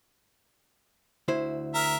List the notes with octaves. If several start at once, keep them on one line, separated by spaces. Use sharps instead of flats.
D2 E4 C5
A#4 E5